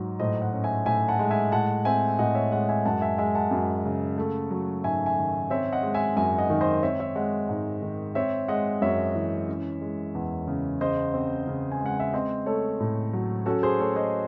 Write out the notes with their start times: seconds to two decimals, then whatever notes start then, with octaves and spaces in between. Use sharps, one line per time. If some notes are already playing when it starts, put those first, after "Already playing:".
Already playing: G#2 F#3
0.20 A2 C5 D#5
0.42 D#5 F#5
0.53 C#4
0.64 E5 G#5
0.86 A2 E5 G#5
1.08 F#5 A5
1.19 G#3
1.30 E5 G#5
1.52 A2 F#5 A5
1.85 C4 E5 G#5
2.19 A2 D#5 F#5
2.35 C#5 E5
2.52 G#3 D#5 F#5
2.69 E5 G#5
2.85 F#2 F#5 A5
3.01 E5 G#5
3.18 G#3 E5 G#5
3.35 F#5 A5
3.51 F#2
3.84 C#3
4.18 A3
4.51 F#3
4.84 G#2 E5 G#5
5.06 E5 G#5
5.17 D#3
5.50 C4 C#5 E5
5.72 D#5 F#5
5.83 G#3
5.94 E5 G#5
6.16 F#2 E5 G#5
6.38 D#5 F#5
6.50 D#3
6.61 C5 D#5
6.83 C4 C#5 E5
7.00 C#5 E5
7.16 G#3 D#5 F#5
7.49 G#2
7.82 D#3
8.15 C4 C#5 E5
8.48 G#3 D#5 F#5
8.81 F#2 C#5 E5
9.16 E3
9.48 C#4
9.81 G#3
10.15 E2
10.47 C#3
10.81 C#3 C5 D#5
11.14 C4
11.47 C#3
11.71 G#5
11.81 G#3 F#5
12.00 E5
12.13 C4 C5 D#5
12.46 A3 A4 C#5
12.80 A2
13.13 F#3
13.46 C#4 F#4 A4
13.63 G#4 C5
13.79 A3 A4 C#5
13.96 C5 D#5